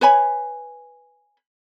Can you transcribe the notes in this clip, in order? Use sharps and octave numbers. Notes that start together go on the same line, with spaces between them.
B4 C#5 G#5 B5